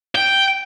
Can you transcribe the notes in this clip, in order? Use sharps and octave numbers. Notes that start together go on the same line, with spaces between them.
G5